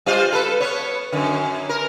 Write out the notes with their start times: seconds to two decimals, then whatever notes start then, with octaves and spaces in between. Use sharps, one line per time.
0.06 G3 F4 C5
0.32 A4 B4
0.60 B3 C#5
1.12 F#2 D3
1.69 A#4